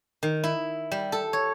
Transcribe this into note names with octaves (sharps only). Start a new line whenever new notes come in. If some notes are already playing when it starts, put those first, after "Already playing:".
D#3
E4
G3
A4
C#5